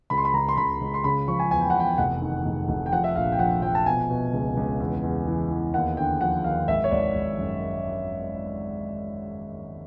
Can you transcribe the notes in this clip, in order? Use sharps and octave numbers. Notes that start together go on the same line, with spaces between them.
C#2 B5
C6
B5
C#2 A#5
C6
C#2 B5
C#2
C6
C#3 B5
F3 C#6
G#5
E2 G#5
G5
F#5
E2
G5
F1 F#5
D#3
F1
F1
G5
F3 F#5
E5
A#1 F5
G5
F3 F#5
F3 G5
A5
B2 G#5
B2
C#2
C#2
E2
E2
E3
E2
D#2 F#5
D3 G5
F3 F#5
D#2 F5
G#1 E5
C#5
G#1 D5
G#1
F#2